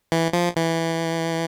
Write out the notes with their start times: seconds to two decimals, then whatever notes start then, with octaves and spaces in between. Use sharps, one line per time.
0.12 E3
0.33 F3
0.56 E3